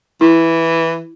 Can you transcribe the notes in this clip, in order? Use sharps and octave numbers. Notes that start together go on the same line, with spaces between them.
E3 E4